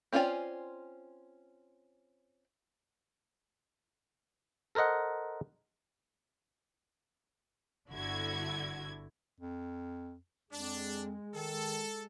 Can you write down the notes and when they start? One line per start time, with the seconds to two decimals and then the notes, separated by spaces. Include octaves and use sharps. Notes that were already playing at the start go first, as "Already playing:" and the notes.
0.13 C4 C#4 F4 D5 G#5
4.75 A4 A#4 C5 D#5 F#5
7.90 G1 D3 E4 F#4 G#6
9.40 F2
10.53 F2 G#3 D4
11.35 D#3 A4